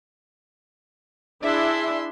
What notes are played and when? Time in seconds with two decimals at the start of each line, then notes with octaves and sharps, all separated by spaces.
1.42 D4 E4 G#4 E5 C6